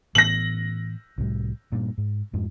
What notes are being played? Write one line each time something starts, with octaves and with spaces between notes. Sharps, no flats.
A2 E3 B3 A#6 F#7
C2 A2 G3
G2 A#2
G#2
F2 G#2 F3